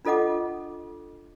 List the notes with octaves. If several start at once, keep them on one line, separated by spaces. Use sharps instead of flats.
D4 F4 A4 D#5 F#5 D6